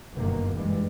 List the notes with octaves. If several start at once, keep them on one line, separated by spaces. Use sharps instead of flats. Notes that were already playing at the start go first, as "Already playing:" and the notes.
F#1 D2 G2 B2 D#3 A#3
G2 A#2 E3 G3 G#3